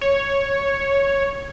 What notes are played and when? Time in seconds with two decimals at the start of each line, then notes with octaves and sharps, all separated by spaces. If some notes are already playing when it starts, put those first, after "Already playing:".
0.01 C#5